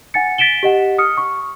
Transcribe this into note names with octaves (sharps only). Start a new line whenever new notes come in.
F#5 G#5 A6 C#7
A6 B6 D7 E7 G7
G4 D#5 F#5
D#6 F6 C#7
C#6